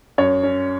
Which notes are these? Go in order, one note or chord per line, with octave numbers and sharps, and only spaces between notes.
F#2 C#5
C#4